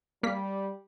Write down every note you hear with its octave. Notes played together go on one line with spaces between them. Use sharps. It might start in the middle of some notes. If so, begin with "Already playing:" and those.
G3 A#3 B6